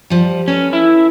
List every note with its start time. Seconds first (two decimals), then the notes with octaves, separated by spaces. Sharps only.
0.10 F3 G3
0.48 C#4 A4 B4
0.73 E4